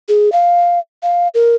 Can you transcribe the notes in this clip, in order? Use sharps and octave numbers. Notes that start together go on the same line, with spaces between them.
G#4
F5
F5
A#4